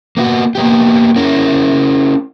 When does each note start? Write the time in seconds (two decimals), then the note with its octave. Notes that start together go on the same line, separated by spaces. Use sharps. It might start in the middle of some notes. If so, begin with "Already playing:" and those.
0.17 A#3 B3 F4 F#4
0.55 A#3 B3 G4
1.16 C#4 E4 A#4